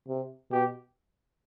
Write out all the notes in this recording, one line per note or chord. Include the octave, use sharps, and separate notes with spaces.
C3
B2 G4